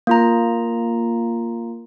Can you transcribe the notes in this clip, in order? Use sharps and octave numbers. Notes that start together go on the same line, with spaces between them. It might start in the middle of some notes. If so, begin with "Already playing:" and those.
A#3 F4 A#5